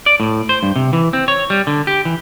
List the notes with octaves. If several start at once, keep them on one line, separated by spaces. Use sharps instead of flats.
D5
A2
C5
G2
C3
E3
C4
C#5
G3
D3
G4
E3